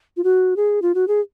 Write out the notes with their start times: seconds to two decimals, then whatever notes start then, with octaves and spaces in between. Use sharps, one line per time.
0.17 F4
0.24 F#4
0.56 G#4
0.82 F4
0.95 F#4
1.08 G#4